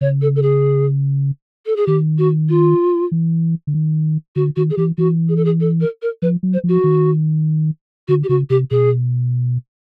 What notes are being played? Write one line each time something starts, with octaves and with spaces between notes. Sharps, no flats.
C#3 C#5
A4
A4
G#4
A4
G#4
D#3 G4
F#4
F4
E3
D3
D#3
D3 F#4
D#3 F#4
G#4
E3 G4
E3 F#4
G#4
A4
G#4
A4
A#4
A#4
F3 B4
F#3
C5
F3 F#4
D#3
D3 F#4
G4
C#3 F#4
C3 G4
B2 G#4